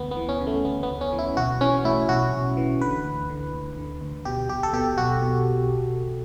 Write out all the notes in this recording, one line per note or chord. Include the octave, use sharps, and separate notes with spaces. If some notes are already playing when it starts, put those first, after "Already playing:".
Already playing: D2 B3
B3
E3
C#4
C#3
A3
D2 B3
B3
D2
C#4
E3
E4
B1 F#4
E3 C#4
A2 E4
B1 F#4
B1
E3
D3 B4
D2
D3
D2
D3
D2
B2 G4
B1 G4
A4
B2 G4
B1 F#4
B2